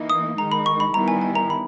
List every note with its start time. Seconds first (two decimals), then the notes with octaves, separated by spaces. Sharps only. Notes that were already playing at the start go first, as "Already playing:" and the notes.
Already playing: E3 A#3 D#4
0.10 D#6
0.38 D#3 G#3 D#4 A#5
0.52 B5
0.66 C#6
0.80 B5
0.94 D#3 G3 B3 E4 A#5
1.08 G#5
1.22 G#5
1.35 A#5
1.50 B5